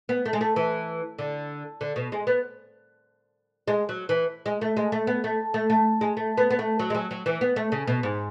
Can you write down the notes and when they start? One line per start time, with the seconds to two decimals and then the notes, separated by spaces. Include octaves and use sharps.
0.09 B3
0.26 A3
0.33 G#3
0.41 A3
0.56 E3
1.19 D3
1.81 D3
1.96 B2
2.12 G#3
2.27 B3
3.67 G#3
3.89 F#3
4.09 E3
4.46 G#3
4.61 A3
4.77 G#3
4.92 A3
5.07 B3
5.24 A3
5.54 A3
5.70 A3
6.01 G#3
6.17 A3
6.37 B3
6.50 B3
6.59 A3
6.79 F#3
6.90 G#3
6.95 F#3
7.11 F#3
7.26 E3
7.41 B3
7.56 A3
7.72 C#3
7.87 B2
8.03 G#2